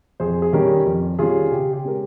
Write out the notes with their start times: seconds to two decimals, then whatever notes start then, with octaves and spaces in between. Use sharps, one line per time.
0.20 F2 G#4 C5
0.42 G#4
0.53 D#3 G3 C#4 G4 A#4
0.86 F2
1.19 D#3 G3 C#4 F4 G#4
1.52 C#3 G4
1.73 G4
1.84 G#3 C#4 A#4